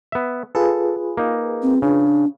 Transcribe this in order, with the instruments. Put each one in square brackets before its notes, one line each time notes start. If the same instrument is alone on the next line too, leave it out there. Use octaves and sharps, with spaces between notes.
[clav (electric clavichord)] B3 E5
[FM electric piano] F4 G#4 B4 [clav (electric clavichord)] A4
[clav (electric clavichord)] A#3 D#4
[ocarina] C4
[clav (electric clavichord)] C#3 [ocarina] D4